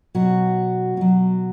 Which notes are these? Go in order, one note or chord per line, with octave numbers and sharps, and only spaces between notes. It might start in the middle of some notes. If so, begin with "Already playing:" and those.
B2 F#3 F#4
B2 F#3